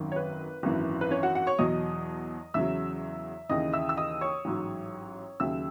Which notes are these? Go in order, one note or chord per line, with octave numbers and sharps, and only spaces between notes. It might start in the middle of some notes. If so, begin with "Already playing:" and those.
Already playing: G#1 F#2 D#3 F#3
C#5
B4
G#1 F#2 E3
B4
C#4 C#5
F#4 F#5
F#4 F#5
C#5 C#6
E2 B2 F#3 D#5 D#6
E2 C#3 F#3 E5 E6
D#2 C#3 E3 D#5 D#6
E5 E6
E6
D#5 D#6
C#5 C#6
A1 G#2 F#3
D#2 C#3 F#3 E5 E6